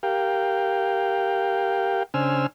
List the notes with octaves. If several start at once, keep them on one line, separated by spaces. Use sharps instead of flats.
G4 A#4 F5 G5
C#3 D4 C5 G#5 E6 F6